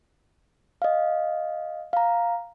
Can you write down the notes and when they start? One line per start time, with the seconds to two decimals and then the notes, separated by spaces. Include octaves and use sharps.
0.82 D#5 F5
1.93 F5 A#5